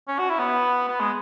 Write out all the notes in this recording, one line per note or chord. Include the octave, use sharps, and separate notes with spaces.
C#4
F#4
E4
B3
B3
G#3